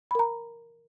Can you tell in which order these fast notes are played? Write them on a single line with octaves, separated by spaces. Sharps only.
B5 A#4 A#5